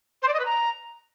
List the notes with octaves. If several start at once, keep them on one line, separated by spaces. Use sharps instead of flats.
C5
D5
D#5
B4
A#5